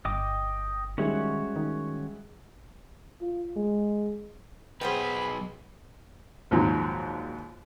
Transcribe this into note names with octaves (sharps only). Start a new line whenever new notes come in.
G1 D#5 G5 D6
D#3 G3 G#3 C#4 F#4 C#5 E5
D#3
F4
G#3
B1 G3 B3 G#4 B4 C5 B5
A#1 D#2 G#2 F3 F#3